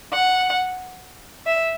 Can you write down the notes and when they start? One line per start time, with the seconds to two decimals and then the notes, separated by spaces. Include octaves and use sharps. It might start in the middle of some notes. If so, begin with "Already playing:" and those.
0.13 F#5
1.46 E5